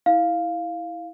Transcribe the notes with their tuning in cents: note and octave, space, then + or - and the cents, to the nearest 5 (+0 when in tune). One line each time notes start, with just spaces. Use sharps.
E4 -15 F5 +0